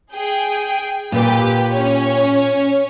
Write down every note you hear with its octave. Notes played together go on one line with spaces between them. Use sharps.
G#4 G5
A#2 G4 B4
C#4 C#5